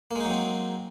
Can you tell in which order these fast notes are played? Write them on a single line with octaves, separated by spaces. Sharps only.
A#3 G#3 D#4 F#3 C4